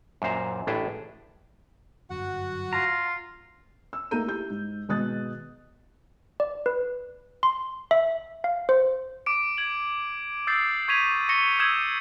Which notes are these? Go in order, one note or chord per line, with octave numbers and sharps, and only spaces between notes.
F#2 A#2 C5 A#5
A1 A2 D4 G#4 E5 G5
G1 F#2 F#3 F#4 F#5
F4 A#5
E6
A3 A#3 D#4 A#5 G6 D#7
E4 G4 G6
G#2
G#1 B2 G#3 D#6 F#6 A6
D5
B4
C6
E5
F5
C5
D6 D7
G#6 F#7
D#6 E6 G6 A6 C7 D7
C#6 G#6 B6 D#7 F7
C#6 A#6 C#7 E7 G7
D#6 E6 G6 G#6 D#7 E7